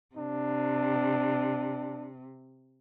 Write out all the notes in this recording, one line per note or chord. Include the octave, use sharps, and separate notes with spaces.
C3 D4